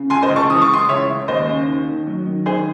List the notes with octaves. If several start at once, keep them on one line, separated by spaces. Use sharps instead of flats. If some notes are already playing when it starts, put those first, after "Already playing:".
Already playing: C#3
C#2 G#5 C6
C5 D#5
C#2
A5 C#6
E3 D#6
C#6
C#2 C6 D#6
C#2 C#5 E5
C#2
D#2 C5 D#5
C#4
D#3
D#3
F#3
D#3
D#3 G#4 C5